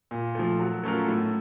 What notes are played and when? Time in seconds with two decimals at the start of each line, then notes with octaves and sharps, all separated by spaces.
0.11 A#2
0.35 F3 A3
0.59 F#3
0.83 A3 C#4 F4 A#4
1.08 A2